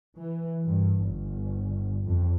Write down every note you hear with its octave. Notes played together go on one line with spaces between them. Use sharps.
E3
G2
G1
F2